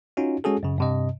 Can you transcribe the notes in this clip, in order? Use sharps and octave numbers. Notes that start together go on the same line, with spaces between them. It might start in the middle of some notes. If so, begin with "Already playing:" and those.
C#4 D#4 F4 F#4
G#3 C#4 F#4 G#4 A4
F#2 C#3
G2 C3 D#5